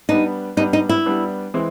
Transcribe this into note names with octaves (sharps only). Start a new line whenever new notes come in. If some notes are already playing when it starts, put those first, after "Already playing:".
G3 B3 D4 D#4
G3 B3 D4 D#4
D#4
E4
G3 B3 D4
E3 G#3 C4 E4